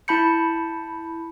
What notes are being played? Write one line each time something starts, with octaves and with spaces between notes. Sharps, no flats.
E4 A5 B5 G6 C#7